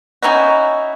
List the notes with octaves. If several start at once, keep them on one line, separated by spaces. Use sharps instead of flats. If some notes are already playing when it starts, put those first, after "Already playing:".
C#4 D#4 E4 F#4